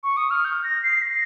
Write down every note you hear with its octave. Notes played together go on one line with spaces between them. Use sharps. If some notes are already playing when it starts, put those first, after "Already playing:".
C#6
D#6
F6
G6
A#6
C7
A#6